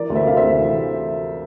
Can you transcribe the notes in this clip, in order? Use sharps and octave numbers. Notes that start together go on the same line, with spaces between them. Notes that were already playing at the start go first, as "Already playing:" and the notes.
Already playing: E3 A#4 D5
D2
C5 E5
C3 F5
C5 E5
D2
E3